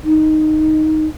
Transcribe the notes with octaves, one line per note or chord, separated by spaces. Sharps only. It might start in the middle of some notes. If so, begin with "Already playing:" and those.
D#4